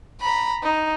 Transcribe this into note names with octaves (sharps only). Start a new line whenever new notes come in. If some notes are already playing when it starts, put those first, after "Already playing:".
A#5 B5
D#4